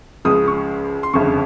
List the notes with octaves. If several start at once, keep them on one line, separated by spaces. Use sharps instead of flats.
C#2 C#3 F3 D#6
C#6
C6
G1 F2 C#3 C#6